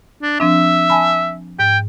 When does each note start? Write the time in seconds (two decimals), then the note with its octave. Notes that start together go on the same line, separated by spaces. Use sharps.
0.22 D4
0.40 F3 C4 D4 E5
0.90 G#5 A5 B5
1.59 G#2 G5